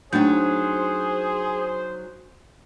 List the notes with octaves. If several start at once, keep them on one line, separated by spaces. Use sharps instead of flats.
F#3 A3 D4 D#4 G#4 C5 G6